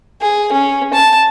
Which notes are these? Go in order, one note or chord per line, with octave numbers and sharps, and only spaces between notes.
G#4
C#4
A5